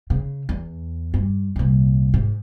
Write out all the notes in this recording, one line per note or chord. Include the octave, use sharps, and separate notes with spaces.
C#3
E2
G2
C2 A#2
G#2